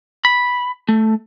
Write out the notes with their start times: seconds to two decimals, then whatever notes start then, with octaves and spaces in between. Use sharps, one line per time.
0.25 B5
0.89 A3